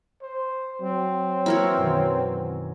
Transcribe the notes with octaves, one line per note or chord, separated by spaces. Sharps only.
C5
F#3 C4
E3 A#3 E4 A#4 C#5
F#2 B2 D#3